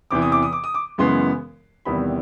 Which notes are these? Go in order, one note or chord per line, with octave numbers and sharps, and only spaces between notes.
E2 C3 E3 D6
D#6
D6
D#6
D6
D#6
D6
F#2 C#3 E3 G#3 B3 C6
E2 C3 D#3 G3 B3 B5